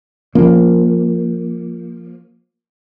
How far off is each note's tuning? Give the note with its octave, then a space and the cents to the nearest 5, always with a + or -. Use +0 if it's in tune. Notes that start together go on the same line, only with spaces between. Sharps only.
F3 +0 A#3 +0 C#4 +0